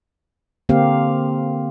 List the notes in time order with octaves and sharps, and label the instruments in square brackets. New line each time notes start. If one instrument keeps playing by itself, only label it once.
[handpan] D3 A#3 C4 G4 F5